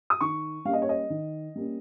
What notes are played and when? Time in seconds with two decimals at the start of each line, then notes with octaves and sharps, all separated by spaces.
0.10 D#6
0.21 D#3 C#6
0.65 G3 A#3 C#4 F5
0.73 D#5
0.82 C#5
0.89 D#5
1.10 D#3
1.56 G3 A#3 C#4